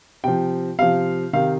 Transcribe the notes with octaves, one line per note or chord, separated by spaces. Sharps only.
C3 F3 G5
C3 F3 F5
C3 D#3 F5